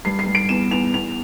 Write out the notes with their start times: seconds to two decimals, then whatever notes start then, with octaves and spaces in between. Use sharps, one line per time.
0.05 G2 C7
0.19 C7
0.26 G2
0.35 D7
0.49 E2 E7
0.71 E2 F7
0.94 E2 F7